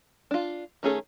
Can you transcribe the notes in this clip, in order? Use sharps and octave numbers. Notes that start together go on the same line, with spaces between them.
D4 F4
D#3 A3 C#4 G#4 A4